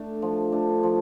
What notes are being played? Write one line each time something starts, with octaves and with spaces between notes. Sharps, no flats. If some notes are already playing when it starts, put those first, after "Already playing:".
Already playing: A3 D4
F3
A3 D4
F3